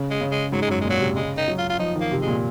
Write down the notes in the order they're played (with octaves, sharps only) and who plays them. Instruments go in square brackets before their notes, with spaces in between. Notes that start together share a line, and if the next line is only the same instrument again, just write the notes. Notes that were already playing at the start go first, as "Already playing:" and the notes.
Already playing: [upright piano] C#3
[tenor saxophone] G#3
[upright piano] C#3
[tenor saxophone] G#3
[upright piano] G#2 [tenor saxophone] F#3
[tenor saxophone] G#3
[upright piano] F#2 [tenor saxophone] F#3
[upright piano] A#2 [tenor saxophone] G#3
[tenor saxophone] F#3
[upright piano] C3
[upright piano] C#3 [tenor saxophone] G#3
[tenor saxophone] D#4
[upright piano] F#3
[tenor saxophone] F4
F4
[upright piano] F3 [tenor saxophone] D#4
[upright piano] D#3
[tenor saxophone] A#3
[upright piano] C3
[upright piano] A#2 [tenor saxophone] G#3